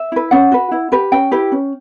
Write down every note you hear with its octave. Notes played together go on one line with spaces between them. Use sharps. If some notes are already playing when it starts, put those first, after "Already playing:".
Already playing: E5
E4 B4
C#4 F#5
F#4 B4
E4
G4 B4
C#4 G5
E4 G4 B4
C#4